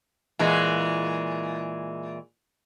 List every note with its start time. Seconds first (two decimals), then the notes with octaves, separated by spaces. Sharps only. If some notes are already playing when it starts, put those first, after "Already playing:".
0.39 A#2 E3 G#3